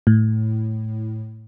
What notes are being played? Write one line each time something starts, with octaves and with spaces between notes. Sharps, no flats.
A2